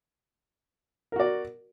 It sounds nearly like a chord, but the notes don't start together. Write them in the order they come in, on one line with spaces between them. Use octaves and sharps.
A#4 F#4 D5